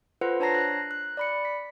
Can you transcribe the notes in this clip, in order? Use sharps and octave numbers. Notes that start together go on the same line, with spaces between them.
F4 A4 B4 C5 F#5
D4 C#5 A5 A#5 A#6 C7
F#6
F#6
D5 B5 C#7
B6